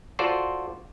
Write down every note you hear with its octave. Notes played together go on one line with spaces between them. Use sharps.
F4 F#4 A4 C5 D5